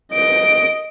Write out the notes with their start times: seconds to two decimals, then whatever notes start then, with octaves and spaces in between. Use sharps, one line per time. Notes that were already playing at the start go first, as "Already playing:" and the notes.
0.12 D#5 D7